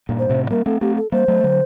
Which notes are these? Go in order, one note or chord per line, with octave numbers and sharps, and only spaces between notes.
G2 A#2
C5
A2 C3
G3 A#3 A#4
A3 C4 A4
A3 C4 G4
A4
G3 A#3 C5
F#3 A3
D3 F#3